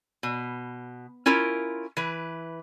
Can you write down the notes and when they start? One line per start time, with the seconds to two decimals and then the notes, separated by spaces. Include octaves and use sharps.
0.23 B2
1.26 C#4 E4 F4 A#4
1.97 E3 B4